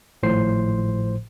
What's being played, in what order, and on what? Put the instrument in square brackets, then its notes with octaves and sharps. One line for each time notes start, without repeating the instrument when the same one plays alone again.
[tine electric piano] G#1 A2 F3 C5 C7